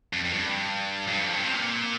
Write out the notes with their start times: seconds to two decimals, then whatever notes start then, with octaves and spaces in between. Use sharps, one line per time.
0.13 F2
0.24 F2
0.33 G2
1.07 F2
1.13 G2
1.23 F2
1.34 G2
1.43 C3
1.54 A#2